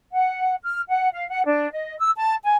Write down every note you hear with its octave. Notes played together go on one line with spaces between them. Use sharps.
F#5
F6
F#5
F5
F#5
D4
D#5
E6
A5
G#5